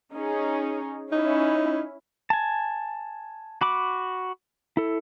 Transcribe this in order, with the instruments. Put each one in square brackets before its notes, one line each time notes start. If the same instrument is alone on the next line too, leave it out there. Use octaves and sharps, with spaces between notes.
[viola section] C#4 D#4 G#4
[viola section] C#4 E4 [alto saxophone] D#4
[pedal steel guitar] G#5 A5
F#4 B5 D6
E4 A4